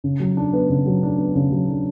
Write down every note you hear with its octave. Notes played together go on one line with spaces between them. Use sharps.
C#3
F#3
D4
B3
C#3
F#3
D4
B3
C#3
F#3
D4